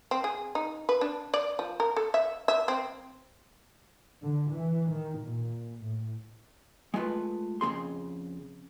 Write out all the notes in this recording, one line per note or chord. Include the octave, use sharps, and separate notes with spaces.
C4
G#4
D#4
B4
D4
D5
F3
A#4
A4
E5
E5
C4
D3
E3
D#3
A#2
A2
G#3 A3 F4 B4
F2 C#3 A3 G#4 C6